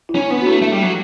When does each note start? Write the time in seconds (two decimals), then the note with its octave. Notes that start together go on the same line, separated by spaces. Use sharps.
0.09 E4
0.15 C#4 D4
0.31 B3
0.41 F#4
0.46 A3 E4
0.62 A3
0.72 G3
0.82 F#3